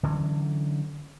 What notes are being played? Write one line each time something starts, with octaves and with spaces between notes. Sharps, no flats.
D3 E3 F#3 C#4